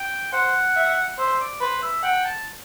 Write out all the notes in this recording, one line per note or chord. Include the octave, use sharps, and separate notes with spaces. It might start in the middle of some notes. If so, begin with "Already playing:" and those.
Already playing: G5
C5 F#5
E5
C5 E5
D5
B4 C5
E5
F#5 G5
A5